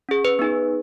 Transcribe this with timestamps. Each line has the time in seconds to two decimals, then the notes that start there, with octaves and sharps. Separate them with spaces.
0.09 C#4 G#4
0.25 B4
0.39 B3 D#4 G#4